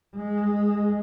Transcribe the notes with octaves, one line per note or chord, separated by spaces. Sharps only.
G#3